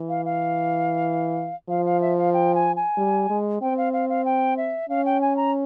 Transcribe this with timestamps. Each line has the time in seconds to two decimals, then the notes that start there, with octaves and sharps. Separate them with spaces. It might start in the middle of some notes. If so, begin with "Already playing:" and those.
Already playing: E3
0.09 F5
0.25 F5
1.69 F3 F5
1.85 F5
2.01 E5
2.18 F5
2.33 G5
2.55 G#5
2.76 G#5
2.97 G3
3.30 G#3
3.61 C4 G5
3.77 F5
3.93 F5
4.09 F5
4.25 G5
4.57 E5
4.89 C#4 F5
5.05 G5
5.21 G#5
5.37 A#5